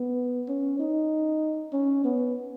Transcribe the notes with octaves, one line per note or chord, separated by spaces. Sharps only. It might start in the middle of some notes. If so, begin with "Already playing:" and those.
Already playing: B3
C#4
D#4
C#4
B3